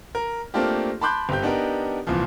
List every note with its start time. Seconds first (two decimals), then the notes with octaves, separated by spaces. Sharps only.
0.15 A#4
0.54 A3 A#3 C4 D4 F4 G4
1.01 A5 B5 C6 D6 F#6 G6
1.29 G1 C4 G4 G6
1.42 B3 D4 D#4 G4 A#4
2.07 C2 A#2 E3 F3